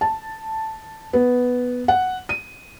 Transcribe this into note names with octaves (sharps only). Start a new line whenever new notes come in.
A5
B3
F#5
D#7